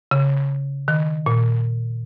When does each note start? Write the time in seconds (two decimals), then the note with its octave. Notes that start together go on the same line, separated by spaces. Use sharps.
0.11 C#3
0.88 D#3
1.26 A#2